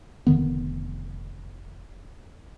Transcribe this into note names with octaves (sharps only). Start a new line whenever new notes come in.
F1 D3 D#3 B3